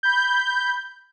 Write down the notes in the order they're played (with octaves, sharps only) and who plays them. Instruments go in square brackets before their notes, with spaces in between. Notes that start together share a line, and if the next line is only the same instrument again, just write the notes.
[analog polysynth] B5 G6